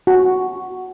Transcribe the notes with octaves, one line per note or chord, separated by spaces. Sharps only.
F#4